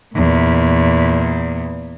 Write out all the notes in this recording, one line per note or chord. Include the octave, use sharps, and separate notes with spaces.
E2 A#2